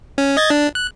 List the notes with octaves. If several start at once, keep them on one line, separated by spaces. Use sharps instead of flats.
C#4
D#5 G#6 A6
D4
F#6